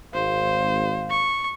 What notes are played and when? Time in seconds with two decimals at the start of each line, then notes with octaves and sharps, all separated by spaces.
0.14 G#1 C5 F5
1.10 C#6